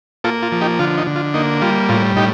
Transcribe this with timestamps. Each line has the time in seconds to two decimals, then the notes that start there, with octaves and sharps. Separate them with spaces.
0.24 A#3 F4 A4
0.43 F4
0.52 F3
0.61 D#4 G4
0.79 D3 F4
0.98 D#4
1.07 D3
1.16 F4
1.34 A#3 D#4
1.62 G3 F4
1.89 A2 F4
2.16 A2 D#4 G4